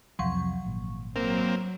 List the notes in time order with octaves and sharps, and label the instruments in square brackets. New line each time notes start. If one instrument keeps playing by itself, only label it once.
[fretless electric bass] C2 F2 C3 [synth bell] F3 F#3 C#6
[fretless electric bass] G#1 A#2
[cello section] F#3 [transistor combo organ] A#3 C4 [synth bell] A#4